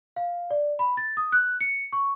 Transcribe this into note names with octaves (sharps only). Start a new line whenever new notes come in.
F5
D5
B5
A6
D#6
F#6
C#7
C#6